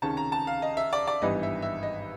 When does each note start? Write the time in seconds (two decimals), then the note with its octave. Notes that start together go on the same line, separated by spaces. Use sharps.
0.02 C#2 C3 D#3 G#3 C#4 A5
0.17 A#5
0.32 A5
0.47 F5
0.62 D#5
0.77 E5
0.93 D5
1.07 D5
1.22 G#1 G2 E3 G3 B3 D#5
1.43 E5
1.62 E5
1.83 D#5